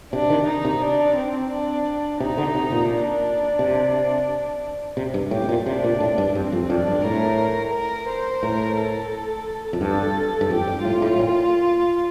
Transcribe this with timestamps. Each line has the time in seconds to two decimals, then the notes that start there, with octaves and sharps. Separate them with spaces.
0.13 C3 D4
0.30 D#3
0.47 D#4
0.65 C3
0.82 D4
1.16 C4
1.52 D4
2.20 C3 D#4
2.38 D3
2.55 C3
2.72 A#2
2.89 D4
3.59 C3
4.97 C3
5.14 G2
5.31 A2 G4
5.44 C3
5.49 A#2
5.66 C3 D4
5.84 A#2
6.00 A2
6.18 G2
6.35 G2 C4
6.52 F2
6.70 F2 D4
6.87 G2
7.05 A2 A#4
7.74 A#4
8.08 C5
8.43 A2 A#4
8.77 A4
9.73 F2
9.81 G2 A4
10.41 G2
10.50 F2 G4
10.67 G2
10.85 A2 F4
11.02 A2
11.19 A#2